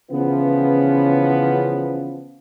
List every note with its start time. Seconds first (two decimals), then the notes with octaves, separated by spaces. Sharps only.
0.12 C#3 E3 F3 B3